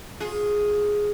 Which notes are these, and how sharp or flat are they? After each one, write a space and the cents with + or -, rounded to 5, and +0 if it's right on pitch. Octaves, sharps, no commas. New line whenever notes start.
F4 +35 G#4 +0